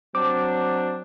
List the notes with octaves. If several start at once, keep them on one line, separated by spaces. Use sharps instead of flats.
F#3 C4 D4 D6